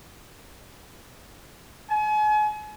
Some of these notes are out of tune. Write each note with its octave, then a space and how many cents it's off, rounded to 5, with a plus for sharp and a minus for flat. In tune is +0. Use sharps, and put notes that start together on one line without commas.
G#5 +40